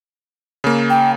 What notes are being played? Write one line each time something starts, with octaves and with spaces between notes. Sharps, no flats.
C#3 A#3
G5